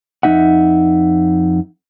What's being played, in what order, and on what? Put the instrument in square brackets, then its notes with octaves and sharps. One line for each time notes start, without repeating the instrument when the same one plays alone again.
[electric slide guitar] F2 A3 D#4 E5 F#5